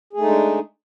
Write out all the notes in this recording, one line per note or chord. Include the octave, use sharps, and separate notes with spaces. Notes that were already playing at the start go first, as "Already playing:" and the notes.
G#3 A3 D4 D#4 G#4